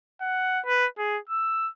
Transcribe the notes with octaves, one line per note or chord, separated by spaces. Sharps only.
F#5
B4
G#4
E6